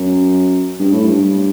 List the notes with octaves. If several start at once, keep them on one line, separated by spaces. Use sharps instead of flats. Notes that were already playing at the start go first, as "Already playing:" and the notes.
Already playing: F#2
G2
A2
G2